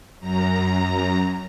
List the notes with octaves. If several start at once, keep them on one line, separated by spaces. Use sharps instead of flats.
F#2 A#5